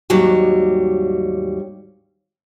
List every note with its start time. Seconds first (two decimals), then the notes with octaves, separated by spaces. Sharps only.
0.10 D#2 G#2 F#3 G3